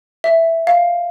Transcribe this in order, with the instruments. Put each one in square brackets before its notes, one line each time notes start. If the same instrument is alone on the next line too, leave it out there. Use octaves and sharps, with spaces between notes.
[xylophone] E5
F5